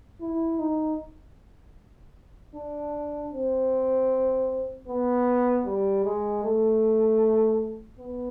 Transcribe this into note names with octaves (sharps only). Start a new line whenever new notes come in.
E4
D#4
D4
C4
B3
G3
G#3
A3
B3